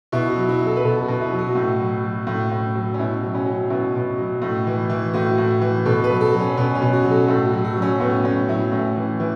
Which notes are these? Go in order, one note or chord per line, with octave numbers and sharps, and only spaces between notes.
B2 E4
F#4
F#3
E4
F#3
A4
B4
B2 A4
F#4
B2
E4
F#3
F#4
A2
F#3
F#3
A2
A2
F#3
C#4
B2 E4
F#3
C#4
F#3
B2 E4
B2
F#3
A2
E3
E3
A2 F#4
A2
E3
B2 A4
B4
F#3
A4
F#3
C#4
B2 C#4
C#4
B2
F#4
F#3
A4
A2 A4
F#4
F#3
F#4
F#3
C#4
A2 B3
A2 C#4
F#3 E4
A2 C#4
E3
E3